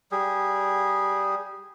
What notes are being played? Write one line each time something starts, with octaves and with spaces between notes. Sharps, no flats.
G3 G#4